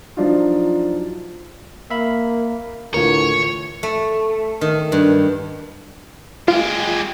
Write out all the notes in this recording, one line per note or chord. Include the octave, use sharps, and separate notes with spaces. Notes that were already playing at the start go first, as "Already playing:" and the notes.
F3 F#3 D4 D#4 F4
A#3 E5 F5 B5
D2 A2 D3 E3 F4 A#4 C#5
A3
D#3
G2
G#3 F4 G4